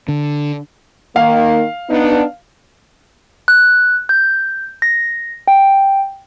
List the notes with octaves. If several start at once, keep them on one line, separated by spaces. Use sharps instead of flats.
D3
D#3 A#3 F5
B3 D4 D#4
F#6
G6
A#6
G5